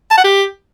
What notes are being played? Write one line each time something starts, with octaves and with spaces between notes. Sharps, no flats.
A5
F#5
G4